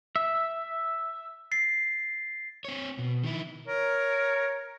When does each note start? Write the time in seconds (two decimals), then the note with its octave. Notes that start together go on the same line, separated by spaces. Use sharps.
0.16 E5
1.51 A6 C7
2.65 C4 C#5
2.99 B2
3.24 D#3 E4
3.68 A#4 C#5